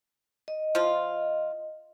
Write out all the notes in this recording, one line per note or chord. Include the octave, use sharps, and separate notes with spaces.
D#5
F3 F4